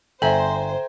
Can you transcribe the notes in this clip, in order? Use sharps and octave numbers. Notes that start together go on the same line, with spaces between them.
G1 A4 C5 E5 G5 G#5 A#5